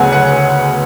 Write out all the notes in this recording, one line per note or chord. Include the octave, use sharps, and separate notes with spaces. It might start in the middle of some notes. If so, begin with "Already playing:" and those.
Already playing: D2 C#3 F#3 B3 F#5 G#5
F#5